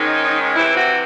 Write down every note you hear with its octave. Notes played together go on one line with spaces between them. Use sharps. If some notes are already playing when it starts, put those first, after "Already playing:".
Already playing: G#2 D#3 G#3 C#4 D#4
C3 E3 C4 E4
F#4